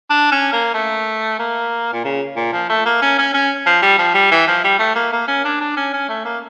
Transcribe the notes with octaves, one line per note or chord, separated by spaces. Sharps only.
D4
C#4
A#3
A3
A#3
A#2
C#3
A#2
F3
A3
A#3
C#4
C#4
C#4
F3
G3
F3
G3
E3
F3
G3
A3
A#3
A#3
C#4
D4
D4
C#4
C#4
A3
A#3